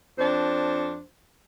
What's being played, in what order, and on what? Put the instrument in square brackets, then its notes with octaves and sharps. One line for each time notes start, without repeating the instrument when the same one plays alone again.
[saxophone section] F2 D4 C5